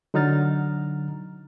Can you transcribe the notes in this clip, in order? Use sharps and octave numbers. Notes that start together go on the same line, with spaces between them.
D3 F#3 D#4 A#5 F6 A6